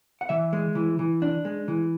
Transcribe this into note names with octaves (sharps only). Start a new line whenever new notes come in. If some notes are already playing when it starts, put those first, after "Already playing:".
F#5
E3 E5
G#3
E3
E3
D4
G#3
E3